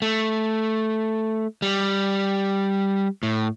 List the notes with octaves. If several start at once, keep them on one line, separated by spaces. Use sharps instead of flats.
A3
G3
A2